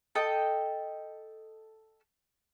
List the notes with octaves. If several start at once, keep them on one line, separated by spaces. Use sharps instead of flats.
A4 D#5 G5